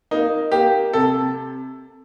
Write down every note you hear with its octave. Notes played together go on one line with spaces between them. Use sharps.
A#3 D#4
A#3 G4
C3 A4